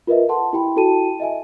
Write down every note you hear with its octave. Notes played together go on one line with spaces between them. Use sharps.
F4 A#4 B4 D#5 E5
A4 F#5 A5 C6
E4 G4 G5 B5
E4 F#4 A4 G5 A5 D#7
D#5 E5 G#5